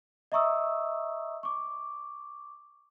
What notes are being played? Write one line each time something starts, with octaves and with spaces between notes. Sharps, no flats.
D#5 E5 A#5 C#6 D#6 E6
C#6 D6